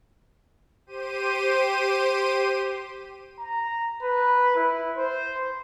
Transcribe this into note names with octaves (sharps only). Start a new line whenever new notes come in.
G4 C5 D#7
A#5
B4
E4
C5